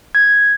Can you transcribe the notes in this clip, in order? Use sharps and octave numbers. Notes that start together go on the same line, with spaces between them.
G#6